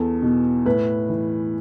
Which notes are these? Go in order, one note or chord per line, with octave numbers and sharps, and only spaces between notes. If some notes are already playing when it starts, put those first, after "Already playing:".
Already playing: E2 A4
B2
A2 B4
E3